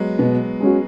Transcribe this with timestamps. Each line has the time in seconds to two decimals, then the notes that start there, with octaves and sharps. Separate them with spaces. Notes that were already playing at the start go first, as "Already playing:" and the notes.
Already playing: F#3 G#3 B3
0.19 B2 B3
0.60 G#3 C#4 F#4